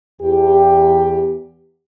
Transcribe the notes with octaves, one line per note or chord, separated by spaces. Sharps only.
E2 G4